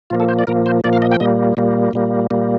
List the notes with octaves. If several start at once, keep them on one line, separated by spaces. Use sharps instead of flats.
A#2 F3 A#3 F4
A4
C5
D5
A#2 F3 A#3 A#4
C5
A#2 F3 A#3 D5
F5
D#5
G5
A#2 G3 A#3 D#5
A#2 G3 A#3
A#2 G3 A#3
A#2 G3 A#3